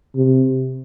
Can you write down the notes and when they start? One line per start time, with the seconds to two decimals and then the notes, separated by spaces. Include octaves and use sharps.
0.16 C3